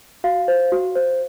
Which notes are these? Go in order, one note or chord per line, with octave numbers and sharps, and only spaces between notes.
F#4 F5
C5
F#4
C5